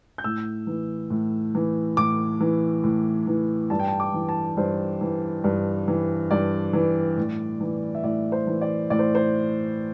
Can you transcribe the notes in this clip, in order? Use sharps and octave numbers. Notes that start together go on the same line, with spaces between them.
G6
A2 E6
E3
A2
E3
A2 D6
E3
A2
E3
G2 A5
G5
A5
D6
E3
A5
G2 C5
E3
G2
E3
G2 D5
E3
A2
E3
E5
A2 D5
C5
E3
D5
A2 D5
C5
C5